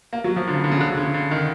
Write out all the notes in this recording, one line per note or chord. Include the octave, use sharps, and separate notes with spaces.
A#3
F#3
F3
D3
C#3
D3
C#3
D3
C#3
D3
C#3
D3
D#3